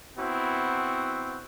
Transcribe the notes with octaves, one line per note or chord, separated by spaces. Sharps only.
B3 C4 E4 F#4